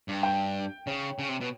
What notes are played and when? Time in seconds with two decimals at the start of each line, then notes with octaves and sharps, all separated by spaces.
0.08 G2
0.23 G5
0.87 C#3 C#5
1.19 C#3
1.29 C3
1.41 B2